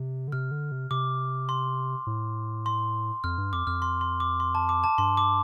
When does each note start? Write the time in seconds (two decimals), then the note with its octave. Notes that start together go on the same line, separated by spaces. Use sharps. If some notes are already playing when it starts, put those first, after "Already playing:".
Already playing: C3
0.28 D3
0.32 C3 F6
0.51 D3
0.72 C3
0.91 C3 D6
1.49 C6
2.07 A2
2.66 C6
3.24 F2 F6
3.38 G2
3.53 F2 D6
3.67 F2 F6
3.82 C6
4.01 C6
4.20 D6
4.40 C6
4.55 A5
4.69 D6
4.84 A5
4.98 G2 C6
5.17 D6